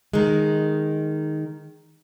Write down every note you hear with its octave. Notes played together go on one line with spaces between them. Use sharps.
D#3 G#3